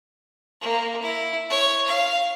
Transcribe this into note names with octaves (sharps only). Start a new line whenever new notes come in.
A#3
E4
C#5
F5